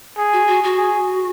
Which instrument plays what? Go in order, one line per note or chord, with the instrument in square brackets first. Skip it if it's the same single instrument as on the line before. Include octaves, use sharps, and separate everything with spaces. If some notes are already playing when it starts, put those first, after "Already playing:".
[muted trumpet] G#4
[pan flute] F#4
F#4
F#4
[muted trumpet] G#4